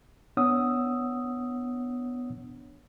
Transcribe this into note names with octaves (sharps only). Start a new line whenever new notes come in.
B3 D4 C#5 F#5 D#6 E6